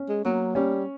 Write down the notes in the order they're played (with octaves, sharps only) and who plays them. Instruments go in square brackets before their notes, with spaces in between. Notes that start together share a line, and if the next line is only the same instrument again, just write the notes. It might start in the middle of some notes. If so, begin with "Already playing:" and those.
Already playing: [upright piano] C#4
[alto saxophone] G#3
[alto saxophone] F#3 [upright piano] A#3
[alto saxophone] G3 [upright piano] C#4